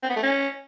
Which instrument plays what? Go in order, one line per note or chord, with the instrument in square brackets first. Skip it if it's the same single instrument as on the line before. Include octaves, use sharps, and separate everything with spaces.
[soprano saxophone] C4
B3
A3
C#4